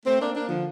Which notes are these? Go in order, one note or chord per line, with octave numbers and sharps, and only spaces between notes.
A3 C4
A#3 D4
A#3 D4
D3 F3